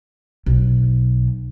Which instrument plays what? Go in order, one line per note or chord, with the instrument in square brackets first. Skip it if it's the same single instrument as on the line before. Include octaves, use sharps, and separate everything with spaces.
[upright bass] B1